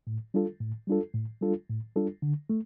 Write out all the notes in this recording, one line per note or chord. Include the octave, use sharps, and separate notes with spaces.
A2
G3 D4 F4 A4
A2
G3 D4 F4 A4
A2
G3 D4 F4 A4
A2
G3 D4 F4 A4
D3
A3